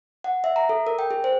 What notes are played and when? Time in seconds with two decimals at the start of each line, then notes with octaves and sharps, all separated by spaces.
0.24 F#5
0.44 E5
0.56 A#5
0.69 A4
0.87 A#4
0.99 G5
1.11 G#4
1.24 C5